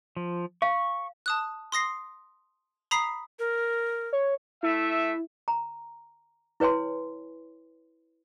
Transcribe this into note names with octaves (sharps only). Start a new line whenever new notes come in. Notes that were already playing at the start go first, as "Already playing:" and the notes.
F3
F5 C#6
A5 D#6 F#6
C6 D#6 A#6 C7
A#5 B5 D#6 B6 C7
A#4
C#5
A3 E4 E5
A#5
E4 B4 C#5 G#5 C6